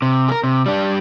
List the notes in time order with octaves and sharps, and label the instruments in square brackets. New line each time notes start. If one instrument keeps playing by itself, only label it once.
[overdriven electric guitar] C3
G#4 A#4
C3
G3 D4